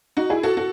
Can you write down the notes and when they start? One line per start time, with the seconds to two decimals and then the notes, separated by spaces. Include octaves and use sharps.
0.17 D#4 F#4
0.30 E4 G#4
0.43 F#4 A4
0.57 F#4 A4